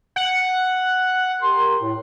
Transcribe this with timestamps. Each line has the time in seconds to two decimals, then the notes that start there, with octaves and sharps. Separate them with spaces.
0.16 F#5
1.41 G4 A#4 C6
1.80 A2